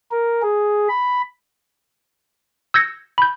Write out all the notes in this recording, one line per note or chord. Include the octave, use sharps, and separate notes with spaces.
A#4
G#4
B5
E6 G6 G#6 A#6 C#7
B5 G6